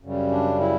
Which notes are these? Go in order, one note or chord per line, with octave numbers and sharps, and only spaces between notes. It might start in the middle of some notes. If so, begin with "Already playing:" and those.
F#2 C#3 G3
D4
E4